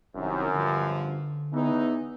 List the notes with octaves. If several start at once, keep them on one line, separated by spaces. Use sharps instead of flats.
F#1 C2 F#2 D#3
G2 D3 F3
E2 E3 B3 D#4